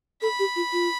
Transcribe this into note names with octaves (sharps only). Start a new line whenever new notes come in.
A4 B5
G4
F4
F4